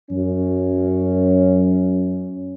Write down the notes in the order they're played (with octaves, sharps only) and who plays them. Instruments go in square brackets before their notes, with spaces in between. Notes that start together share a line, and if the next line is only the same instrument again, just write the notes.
[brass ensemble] F#2 C#4